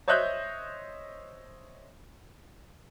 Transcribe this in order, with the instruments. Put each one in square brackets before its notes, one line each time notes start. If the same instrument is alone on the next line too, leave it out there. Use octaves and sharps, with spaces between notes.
[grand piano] C5 C#5 D#5 E5 F#6 G6